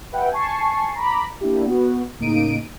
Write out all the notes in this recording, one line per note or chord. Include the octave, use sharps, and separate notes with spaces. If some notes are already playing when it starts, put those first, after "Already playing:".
G4 B4 E5 F#5 G5
G#5 A5 C#6 C7
A#5 B5 D6
A#3 D4 E4 G4
B3 F#4
A2 C#3 A#3 D#4 D7 D#7